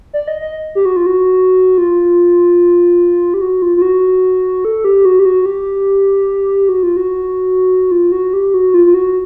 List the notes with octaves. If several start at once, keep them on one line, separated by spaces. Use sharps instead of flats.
D5
D#5
D#5
G4
F#4
F4
F#4
F4
G4
F#4
F4
F4
F#4
A4
G4
F#4
G4
F#4
G4
F#4
F4
F#4
F4
F#4
G4
F#4
F4
F4
F#4